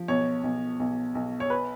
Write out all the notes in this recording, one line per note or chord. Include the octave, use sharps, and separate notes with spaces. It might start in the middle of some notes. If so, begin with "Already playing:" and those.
Already playing: F3
B1 C#5
B1
B1
B1
C#5
B4